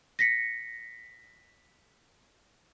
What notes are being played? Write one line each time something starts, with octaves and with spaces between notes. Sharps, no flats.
A#6 B6 C#7